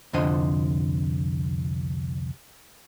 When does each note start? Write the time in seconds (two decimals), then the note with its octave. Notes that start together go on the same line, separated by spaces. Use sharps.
0.13 C2 F2 D3 C5 D#5